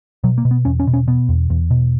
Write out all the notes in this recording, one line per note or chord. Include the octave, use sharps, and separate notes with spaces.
B2 F#3
A#3
B2
B3
E2 C#4
C#4
B2
C#4
B2 B3
E2
E2
B2